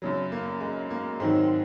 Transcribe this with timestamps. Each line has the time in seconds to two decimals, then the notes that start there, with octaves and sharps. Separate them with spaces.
0.02 F#2 C#3 F#3
0.32 A#3
0.60 G#3
0.90 A#3
1.19 G#2 D#3 F#3 G#3 C4